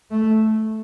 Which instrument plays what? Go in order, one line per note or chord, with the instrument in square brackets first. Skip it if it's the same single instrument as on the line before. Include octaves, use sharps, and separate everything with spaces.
[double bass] A3